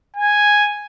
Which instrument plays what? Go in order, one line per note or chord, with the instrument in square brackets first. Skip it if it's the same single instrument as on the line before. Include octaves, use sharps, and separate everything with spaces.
[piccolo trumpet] G#5